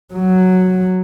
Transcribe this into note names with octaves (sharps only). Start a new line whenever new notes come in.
F#3